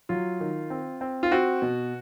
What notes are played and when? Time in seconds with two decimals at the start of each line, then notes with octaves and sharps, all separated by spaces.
0.09 F#3 F4
0.40 D#3
0.70 C4
1.01 C4
1.23 F4
1.32 C4 F#4
1.62 B2